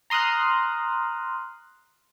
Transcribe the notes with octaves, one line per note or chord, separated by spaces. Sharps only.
A#5 C6 D#6 F6 F#6